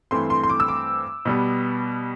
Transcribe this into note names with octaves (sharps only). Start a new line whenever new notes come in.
G2 E3 A3 C4 C6
C6
C6
D6
E6
D6
B2 G3 B3